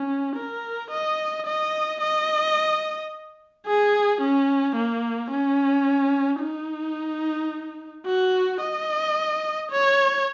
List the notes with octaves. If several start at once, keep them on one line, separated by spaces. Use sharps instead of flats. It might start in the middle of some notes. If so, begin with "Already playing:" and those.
Already playing: C#4
A#4
D#5
D#5
D#5
G#4
C#4
A#3
C#4
D#4
F#4
D#5
C#5